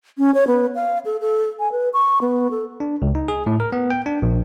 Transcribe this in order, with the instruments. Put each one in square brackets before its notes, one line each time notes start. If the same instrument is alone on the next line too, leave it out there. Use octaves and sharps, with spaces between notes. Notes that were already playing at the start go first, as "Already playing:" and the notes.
[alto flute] C#4
C#5
B3
F5
A4
A4
G#5
B4
C#6
B3
A4
[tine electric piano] D4
C#2
D#4
G#4
A2
A#4
B3
G5
D4
A#1